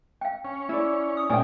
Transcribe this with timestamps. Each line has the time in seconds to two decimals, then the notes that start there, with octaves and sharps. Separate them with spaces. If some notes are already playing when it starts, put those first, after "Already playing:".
0.21 F5 G5
0.45 C#4
0.69 E4 D5
1.17 D#6
1.30 A#2 G#3 A3 C#4 D5 G5 G#5 D#6